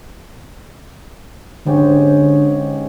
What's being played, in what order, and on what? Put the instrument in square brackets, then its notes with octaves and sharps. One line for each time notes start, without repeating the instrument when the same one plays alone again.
[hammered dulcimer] G#2 C#4 G4 [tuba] D3